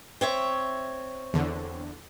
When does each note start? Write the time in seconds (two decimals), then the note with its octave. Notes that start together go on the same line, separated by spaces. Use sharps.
0.21 C4 C#5 E5
1.33 E2 D3